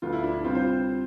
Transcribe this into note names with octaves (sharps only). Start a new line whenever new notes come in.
D2 D3 F3 B3 F4
E4
D4
E4
C3 G3 C4 F4
C5